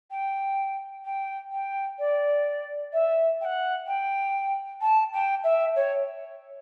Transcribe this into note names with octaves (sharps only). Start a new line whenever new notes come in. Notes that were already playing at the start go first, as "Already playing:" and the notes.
G5
G5
G5
D5
E5
G5
F#5
G5
A5
G5
E5
C#5